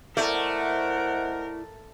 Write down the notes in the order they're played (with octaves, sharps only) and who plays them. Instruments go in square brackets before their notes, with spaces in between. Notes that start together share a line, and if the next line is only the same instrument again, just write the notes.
[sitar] A3 [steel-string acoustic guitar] E4 D5 [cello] A#4 [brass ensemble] C5 D#5 F#5